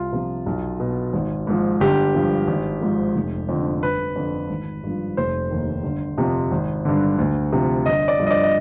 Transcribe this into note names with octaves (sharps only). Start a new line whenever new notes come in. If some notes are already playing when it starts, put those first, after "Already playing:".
Already playing: C2 F4
C3 F3
B1
B2
G#1
G#2 F3
G1 G4
G2 F3
G#1
G#2 F3
F1
F2 D3
G1 B4
F2 D3 F3
G#1
G2 F3
F1 C5
D#2 D#3
G1
F2 C3 F3
G#1
G2 D3
D2
C3 F3
G1 D#5
D5
G2 F3
D#5
D5
D#5